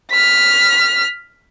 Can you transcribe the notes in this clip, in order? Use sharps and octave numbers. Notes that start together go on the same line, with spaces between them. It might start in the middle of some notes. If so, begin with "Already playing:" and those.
F6 B6